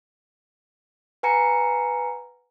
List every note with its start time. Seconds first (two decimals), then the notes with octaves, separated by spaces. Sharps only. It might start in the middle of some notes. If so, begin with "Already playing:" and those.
1.23 B4 F#5 G#5 A#5 C#7